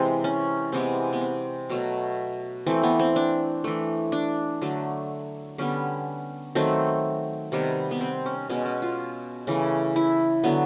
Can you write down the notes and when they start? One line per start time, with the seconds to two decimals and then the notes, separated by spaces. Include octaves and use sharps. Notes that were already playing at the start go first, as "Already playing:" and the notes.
Already playing: C3 E3 G#3 C4
0.24 C#4
0.72 C3 E3 G#3 B3 C4
1.13 B3
1.21 C4
1.70 B2 F#3 A3
2.67 E3 A3 C4
2.83 B3
2.99 C4
3.16 D4
3.64 E3 A3
4.12 D4
4.62 D3 F#3 A3
5.58 D3 G3 B3 C#4
6.55 D#3 F#3 A3 C4
7.52 C3 D#3 G3 B3
7.91 B3
8.01 C4
8.26 C#4
8.50 B2 G#3 B3 C#4
8.65 C#4
8.82 F4
9.47 C#3 E3 A3
9.96 E4
10.44 D3 F#3 B3